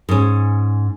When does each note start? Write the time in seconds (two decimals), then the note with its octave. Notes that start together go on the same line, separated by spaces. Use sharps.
0.09 G#2 C#4